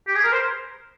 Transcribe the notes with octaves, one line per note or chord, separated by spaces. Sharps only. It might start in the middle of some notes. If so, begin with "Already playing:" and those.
G4
G#4
A#4
C5